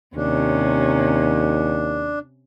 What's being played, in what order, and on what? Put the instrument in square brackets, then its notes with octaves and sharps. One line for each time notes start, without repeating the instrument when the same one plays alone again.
[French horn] D#2 [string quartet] C3 C#4 [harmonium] D4